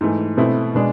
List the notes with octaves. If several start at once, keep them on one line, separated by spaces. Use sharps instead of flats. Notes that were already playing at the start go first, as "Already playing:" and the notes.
G#2 E3 A3
B2 A3 C4 E4
B2 G#3 D4